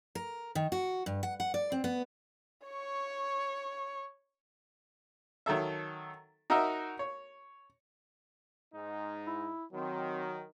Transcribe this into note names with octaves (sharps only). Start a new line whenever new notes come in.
A#4
D#3
F#4
G2
F#5
F#5
D5
C4
B3
C#5 C#6
D#3 F#3 A4 E5
D#4 F#4 A#4 D#5 E5
C#5
G#2 D#4
E4
D#3 F#3 C4